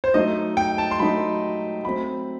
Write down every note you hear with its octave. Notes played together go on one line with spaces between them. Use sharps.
C5
F#3 A3 D#4 D#5
G5
A5
C6
F#3 A3 D#4 B5
F#3 A3 C4 B5